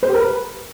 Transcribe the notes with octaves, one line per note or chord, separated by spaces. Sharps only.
C5
G4
A#4
B4